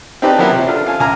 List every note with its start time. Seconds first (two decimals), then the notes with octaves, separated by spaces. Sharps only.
0.22 C4 D#4 G4 B4 D5 A5
0.38 F3 F#3 A#3 B3 E4
0.51 C3
0.67 D4 F4 A4
0.87 F5 G#5 A5
1.00 C#2 G#5 A#5 F6